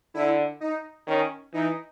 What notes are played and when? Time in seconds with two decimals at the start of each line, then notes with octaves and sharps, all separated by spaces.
0.14 D3 E4
0.60 D#4
1.07 D#3 C#4
1.53 E3 D#4